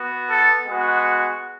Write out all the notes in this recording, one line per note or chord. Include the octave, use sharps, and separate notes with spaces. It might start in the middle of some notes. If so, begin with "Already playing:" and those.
Already playing: B3 F#4
A4
G#3 B3 F#4